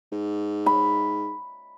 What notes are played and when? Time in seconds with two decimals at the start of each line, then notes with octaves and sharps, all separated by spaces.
0.12 G#2
0.66 B5